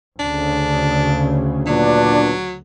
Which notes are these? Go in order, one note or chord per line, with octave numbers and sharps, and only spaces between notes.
D2 C#3 D4
A#2 F#3 B3 D4